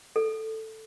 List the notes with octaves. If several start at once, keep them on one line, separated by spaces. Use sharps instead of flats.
A4